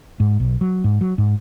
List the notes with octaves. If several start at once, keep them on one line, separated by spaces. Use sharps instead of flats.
G#2
B1
F#3
G#2
F#3
G#2